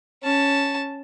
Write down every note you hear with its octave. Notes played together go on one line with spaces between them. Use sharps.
C#4 A5